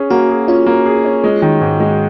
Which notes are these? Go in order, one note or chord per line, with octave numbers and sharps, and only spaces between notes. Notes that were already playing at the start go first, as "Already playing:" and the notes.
Already playing: C#4 G#4
A#3 F#4
G#4
C#4 F4
A#3
G#4
C#4
G#3
D#3
G#2
G#3